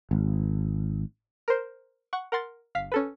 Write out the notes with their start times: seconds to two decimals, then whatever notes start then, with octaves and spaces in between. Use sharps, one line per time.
0.11 G#1
1.48 A#4 C5
2.13 F#5 C#6
2.32 A#4 F#5 C6 A6
2.75 G1 F5 B6
2.92 C#4 A4 B4